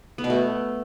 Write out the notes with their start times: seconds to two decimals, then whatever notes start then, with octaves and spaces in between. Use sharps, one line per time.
0.18 B3
0.24 B2
0.30 A3